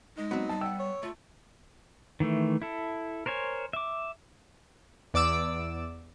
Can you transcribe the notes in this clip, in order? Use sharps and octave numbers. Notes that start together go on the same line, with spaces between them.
G#3 D#4
F#3 B3 C4
G3 A5
B3 F#5 G5 E6
C#5
A3 F4
D#3 E3 A3
E4 A4
A#4 C5 C#5 G#5
E5 D6
E2 D5 D6 E6 D7